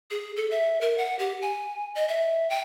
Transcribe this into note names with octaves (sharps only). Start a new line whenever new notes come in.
G#4
A4
E5
A#4
F#5
G4
G#5
D#5
E5
G5